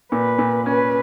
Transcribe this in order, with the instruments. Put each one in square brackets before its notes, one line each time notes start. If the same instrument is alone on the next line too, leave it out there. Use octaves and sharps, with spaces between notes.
[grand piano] A#2 [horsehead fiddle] B4
[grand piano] A#2
[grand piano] C#4 [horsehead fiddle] B4